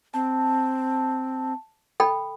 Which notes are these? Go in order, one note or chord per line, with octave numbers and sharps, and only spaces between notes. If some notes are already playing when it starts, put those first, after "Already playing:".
C4 A5
A4 G5 B5